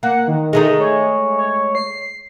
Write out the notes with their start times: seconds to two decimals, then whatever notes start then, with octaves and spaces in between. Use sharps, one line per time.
0.03 A#3 F#5
0.27 D#3
0.53 G#3 A3 D#4
0.80 C#5
1.37 C#5
1.75 C7